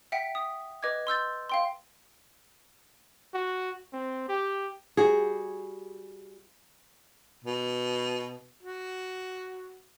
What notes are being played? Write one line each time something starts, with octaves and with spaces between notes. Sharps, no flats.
E5 F#5 G5 B6
D#6
B4 D#5 D6 G#6
C6 E6 G6 A6
F5 G5 C6
F#4
C4
G4
G3 F#4 G#4
B2
F#4